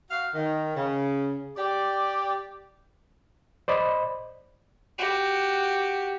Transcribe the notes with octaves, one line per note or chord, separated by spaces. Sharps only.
F#4 F5
D#3
C#3
G4 D5
C5 D5 D#5 B5
F#4 G4